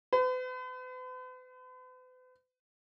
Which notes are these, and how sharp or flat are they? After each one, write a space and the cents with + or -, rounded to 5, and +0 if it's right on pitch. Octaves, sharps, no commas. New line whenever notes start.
B4 +45